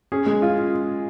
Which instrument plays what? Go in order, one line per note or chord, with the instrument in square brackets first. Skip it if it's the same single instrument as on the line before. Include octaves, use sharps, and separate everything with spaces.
[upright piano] C#4 [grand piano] G#4
[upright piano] G#3
F4